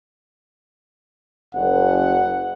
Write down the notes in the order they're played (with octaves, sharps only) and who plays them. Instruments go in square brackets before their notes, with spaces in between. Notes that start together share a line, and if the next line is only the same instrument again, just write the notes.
[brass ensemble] F#1 [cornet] F#5